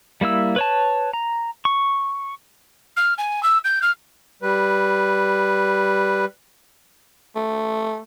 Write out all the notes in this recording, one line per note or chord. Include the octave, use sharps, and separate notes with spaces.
G3 A#3 E4 E6
B4 C#5 A5
A#5
C#6
F6
G#5
E6
G6
F6
G3 B4
A3